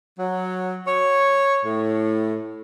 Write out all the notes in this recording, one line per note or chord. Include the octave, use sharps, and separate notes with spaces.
F#3
C#5
A2